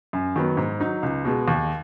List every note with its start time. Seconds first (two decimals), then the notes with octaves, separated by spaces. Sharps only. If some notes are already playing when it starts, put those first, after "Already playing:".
0.13 F#2
0.36 D#3 F#3 B3
0.57 G#2
0.80 F#3 D#4
1.03 C#2
1.25 B2 G#3
1.48 D#2